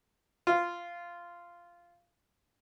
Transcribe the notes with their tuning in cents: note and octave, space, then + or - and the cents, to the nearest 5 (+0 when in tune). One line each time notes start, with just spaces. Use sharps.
F4 -10